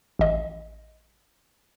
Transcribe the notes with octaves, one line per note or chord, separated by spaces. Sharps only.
A1 D#5